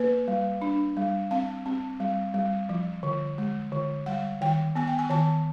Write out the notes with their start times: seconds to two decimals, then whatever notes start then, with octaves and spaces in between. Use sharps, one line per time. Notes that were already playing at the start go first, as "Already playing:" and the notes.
Already playing: A#3 B4
0.28 G3
0.62 D4
0.97 G3
1.31 C4 F5
1.66 C4
2.00 G3
2.34 G3
2.69 F3
3.03 D3
3.38 G#3
3.72 D3
4.06 G3 F#5
4.41 D#3 G5
4.75 B3 G#5
4.87 G5
4.99 G#5
5.10 D#3 A5